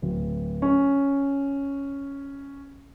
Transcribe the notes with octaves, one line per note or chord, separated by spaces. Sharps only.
D1
C#4